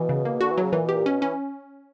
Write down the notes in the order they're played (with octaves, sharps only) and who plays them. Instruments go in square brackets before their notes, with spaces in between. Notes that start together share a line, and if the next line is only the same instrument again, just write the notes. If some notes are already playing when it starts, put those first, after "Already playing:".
Already playing: [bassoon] B2 [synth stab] E3
[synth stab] C#3
A#3
[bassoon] D3 [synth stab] F#4
[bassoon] E3
[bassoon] C#3 [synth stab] F#3
[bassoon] A#2 [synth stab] E3
[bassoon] B2 [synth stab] G4
[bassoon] A#2
[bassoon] B2 [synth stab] C#4
[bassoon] E3 [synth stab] C#4